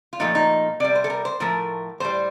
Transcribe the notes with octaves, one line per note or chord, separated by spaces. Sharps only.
F4
A#2 F3 A3 D#4
D#4
C3 G3 D5
C5
A4
A#4
C5
A2 F3 A3 A#4
A2 G3 C5